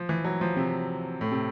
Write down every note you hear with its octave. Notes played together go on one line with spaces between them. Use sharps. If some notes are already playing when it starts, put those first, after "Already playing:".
Already playing: F3
E3
F#3
F3
C3
A2
C3